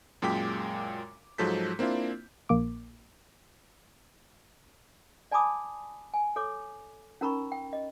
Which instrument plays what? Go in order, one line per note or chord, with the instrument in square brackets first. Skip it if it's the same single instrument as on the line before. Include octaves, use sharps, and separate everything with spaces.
[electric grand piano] F#2 A#2 G#3 G5 D6 B6
G#2 F3 F#3 A4 G6 B6
A#3 C4 D4 E4 F4
[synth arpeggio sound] A#1 A#3 D6
[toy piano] D5 G#5 A5 B5 D6 D#6
G#5
A4 C#5 D6
C#4 D#4 A#4 A#5 B5 C#6
G5
D#5